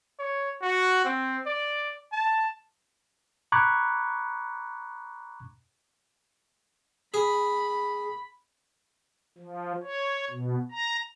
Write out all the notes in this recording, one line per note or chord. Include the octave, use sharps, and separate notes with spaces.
C#5
F#4
C4
D5
A5
A#5 B5 C#6 D6 F#6 G#6
G#4 B5
F3
C#5
B2
A#5